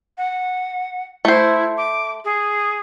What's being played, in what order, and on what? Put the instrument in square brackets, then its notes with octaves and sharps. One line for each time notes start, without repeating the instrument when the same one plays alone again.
[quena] F#5
[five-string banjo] A3 C5 [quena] E4
[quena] D6
G#4